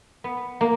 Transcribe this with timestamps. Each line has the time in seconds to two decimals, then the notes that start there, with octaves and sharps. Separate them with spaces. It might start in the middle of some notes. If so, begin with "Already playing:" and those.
0.24 B3
0.61 A#3